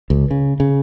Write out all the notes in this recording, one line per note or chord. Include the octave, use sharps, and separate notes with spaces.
C#2
C#3
C#3